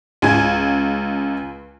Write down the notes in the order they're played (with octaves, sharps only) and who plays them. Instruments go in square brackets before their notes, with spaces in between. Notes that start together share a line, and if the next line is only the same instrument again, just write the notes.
[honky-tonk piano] C#2 G#5 G#6